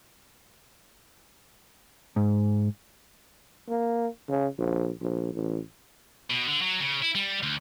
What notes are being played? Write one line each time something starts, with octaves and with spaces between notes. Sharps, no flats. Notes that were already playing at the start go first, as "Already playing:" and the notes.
G#2
A#3
C#3
A#1
A#1
A1
B2
D3
F#3
C#3
E4
G3
D2